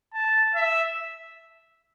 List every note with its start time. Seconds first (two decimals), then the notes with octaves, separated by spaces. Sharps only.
0.14 A5
0.56 E5